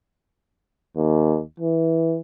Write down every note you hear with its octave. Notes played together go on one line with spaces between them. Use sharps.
D#2
E3